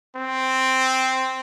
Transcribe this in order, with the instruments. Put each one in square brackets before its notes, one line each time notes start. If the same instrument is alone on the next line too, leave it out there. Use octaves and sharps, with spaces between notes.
[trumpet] C4